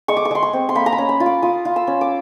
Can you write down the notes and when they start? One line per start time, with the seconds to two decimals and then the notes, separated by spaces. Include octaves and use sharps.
0.08 G#3 C#6
0.17 D6
0.25 C#6
0.31 G#3 C6
0.43 C#6
0.53 C4
0.69 C6
0.75 A#3 B5
0.86 A#5
0.92 B5
0.98 C#4
1.09 B5
1.20 F4
1.26 D6
1.42 F4 D#6
1.65 F4
1.76 E6
1.87 C#4
2.01 D6